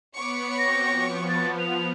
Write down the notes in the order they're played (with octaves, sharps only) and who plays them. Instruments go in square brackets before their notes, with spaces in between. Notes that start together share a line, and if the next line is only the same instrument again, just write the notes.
[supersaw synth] B3 B5 [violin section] C#5 C#6 D6
[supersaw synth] C4 F#4 G5 [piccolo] A#6
[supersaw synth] F3 B3
[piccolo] A6
F7